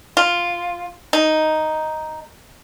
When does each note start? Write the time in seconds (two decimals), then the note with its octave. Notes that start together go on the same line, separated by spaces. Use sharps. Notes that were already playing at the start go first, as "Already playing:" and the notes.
0.17 F4
1.13 D#4